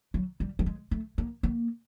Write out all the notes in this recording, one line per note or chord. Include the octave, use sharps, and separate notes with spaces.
F#3
G3
G3
G#3
A3
A#3
A#3